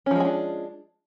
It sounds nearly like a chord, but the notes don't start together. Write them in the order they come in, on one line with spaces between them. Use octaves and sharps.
C#4 F3 G#3 G#4 D4